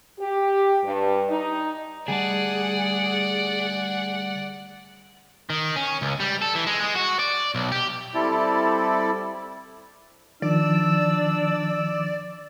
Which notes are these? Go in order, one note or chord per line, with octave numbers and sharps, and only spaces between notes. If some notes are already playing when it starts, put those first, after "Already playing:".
G4
G2
D#4
D2 G3 G#4 D5 F#5 A5
D#3
C#4
C#2
G3
A4
E3
G#3
G#3
F#4
D5
B1
G4
G3 C4 E4 A4 D5
D#3 F3 D4 D5 E6